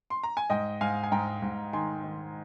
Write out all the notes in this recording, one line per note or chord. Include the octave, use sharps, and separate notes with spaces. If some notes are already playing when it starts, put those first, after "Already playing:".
C6
A#5
G#5
G#2 D#5 G5
G#2 F5 G#5
G#5
G#2 G5 A#5
G#2
D#3 G#5 C6
D#3